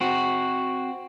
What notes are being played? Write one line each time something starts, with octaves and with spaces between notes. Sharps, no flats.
C4 F#4